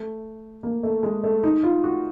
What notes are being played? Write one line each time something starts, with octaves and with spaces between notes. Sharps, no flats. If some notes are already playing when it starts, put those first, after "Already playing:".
Already playing: A3
A#3
A3
G#3
A3
D#4
F4
F#4